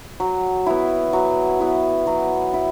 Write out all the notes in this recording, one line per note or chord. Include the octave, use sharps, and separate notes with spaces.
F#3
B3 E4
F#3
B3 E4
F#3
E4